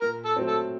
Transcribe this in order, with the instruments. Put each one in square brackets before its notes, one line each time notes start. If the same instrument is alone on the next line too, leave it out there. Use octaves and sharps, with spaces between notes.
[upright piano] A#2 [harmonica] A#4
[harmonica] A4
[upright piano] F#3 A3 C4
[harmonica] A4